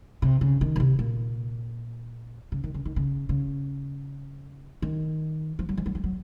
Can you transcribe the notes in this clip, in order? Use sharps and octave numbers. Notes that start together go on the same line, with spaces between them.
C3
C#3
D#3
A#2
C3
A#2
C#3
D#3
C#3
D#3
C#3
C#3
D#3
F3
F#3
F3
F#3
F3
F#3